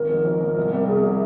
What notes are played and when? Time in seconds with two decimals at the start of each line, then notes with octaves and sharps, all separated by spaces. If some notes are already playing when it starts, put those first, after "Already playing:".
Already playing: G#1 A#4
0.09 G#2 F3
0.25 G#1
0.40 G#2 F3
0.56 C2
0.72 C3 G3 A#4
0.88 C2 G#4
1.03 C3 G3